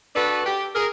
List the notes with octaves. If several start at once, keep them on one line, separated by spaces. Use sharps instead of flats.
D4 F#4 A4 B4
G4
G#4 A#4